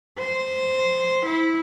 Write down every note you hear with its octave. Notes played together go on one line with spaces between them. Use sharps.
C5
E4